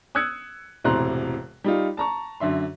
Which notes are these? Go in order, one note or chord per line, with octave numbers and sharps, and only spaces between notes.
D#6 E6 F#6 G#6 C#7
E1 A2 C3 A#5 C6 F#6
G3 D#4 F4
A5 A#5 C#6
F#2 D3 E5 C6